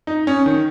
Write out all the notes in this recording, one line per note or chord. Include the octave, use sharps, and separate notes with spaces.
D#4
C#4
D#3